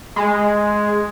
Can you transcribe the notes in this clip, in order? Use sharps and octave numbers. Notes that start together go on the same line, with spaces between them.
G#3